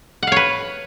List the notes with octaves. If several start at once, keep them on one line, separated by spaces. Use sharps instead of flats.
B4 C#5 F5 F#5